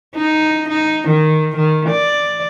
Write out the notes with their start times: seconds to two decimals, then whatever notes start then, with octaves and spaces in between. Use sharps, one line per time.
0.15 D#4
0.68 D#4
1.08 D#3
1.56 D#3
1.90 D5